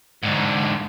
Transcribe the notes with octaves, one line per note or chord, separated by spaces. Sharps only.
G#2 D3